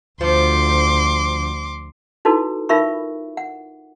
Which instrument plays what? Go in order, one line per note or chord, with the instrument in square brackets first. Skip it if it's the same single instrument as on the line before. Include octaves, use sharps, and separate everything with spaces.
[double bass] D2 [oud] F3 [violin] C6 D6
[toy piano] D#4 E4 F#4 A4 B4
D#4 F4 A#4 E5 B5 C#6
F#5